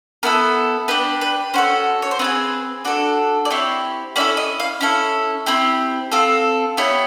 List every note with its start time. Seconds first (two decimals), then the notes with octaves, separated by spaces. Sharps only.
0.23 B3 E4 A4 A#4
0.88 D4 G4 B4
1.21 B4
1.54 C#4 F#4 A4 C5
2.02 C#5
2.11 C5
2.19 C4 F4 B4
2.24 G#4
2.85 D4 F#4 A4
3.45 D5
3.50 C4 E4 G4 C#5
4.16 C#4 E4 A4 D5
4.37 D#5
4.60 F5
4.81 C#4 E4 A4
5.46 C4 E4 G4
6.12 C4 F4 A4
6.77 B3 E4 G4 C#5